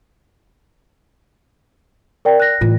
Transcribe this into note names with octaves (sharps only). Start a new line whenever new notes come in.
A#4 D5 G5
F#6 A#6
A2 E3 F4